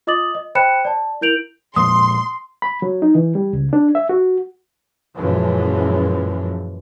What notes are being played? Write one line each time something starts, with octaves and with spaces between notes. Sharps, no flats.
F4 D#5 D6 D#6 A6 F#7
D#5
C5 G5 B5 F#6 C#7 E7
D5 A5
E4 A#4 G6 D7 F7 F#7
A#2 F3 G#3 C6 D#6
B5
F#3
D#4
E3
G3
C#2
D4
E5
F#4
F#2 A#2 E3 F3 G#3